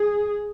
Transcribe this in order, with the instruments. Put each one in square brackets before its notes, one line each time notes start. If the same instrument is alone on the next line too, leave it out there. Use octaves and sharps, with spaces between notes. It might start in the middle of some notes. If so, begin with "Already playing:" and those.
Already playing: [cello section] G#4